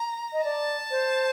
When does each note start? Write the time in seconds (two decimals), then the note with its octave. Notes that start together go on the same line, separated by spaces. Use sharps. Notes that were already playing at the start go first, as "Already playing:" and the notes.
Already playing: A#5
0.33 D#5
0.44 D5 A5
0.91 C5